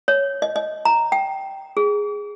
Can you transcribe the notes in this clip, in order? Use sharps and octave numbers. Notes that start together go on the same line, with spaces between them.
C#5
D#5
D#5
A#5
G5
G#4